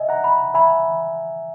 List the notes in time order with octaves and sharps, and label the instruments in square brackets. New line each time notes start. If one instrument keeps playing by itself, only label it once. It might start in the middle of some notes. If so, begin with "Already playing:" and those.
Already playing: [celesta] D#5 [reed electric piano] E5 G#5
[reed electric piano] F#5 A#5
[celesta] B5
[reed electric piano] E5 G#5 [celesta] B5